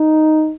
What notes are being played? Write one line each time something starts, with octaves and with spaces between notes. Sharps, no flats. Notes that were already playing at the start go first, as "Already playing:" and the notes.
Already playing: D#4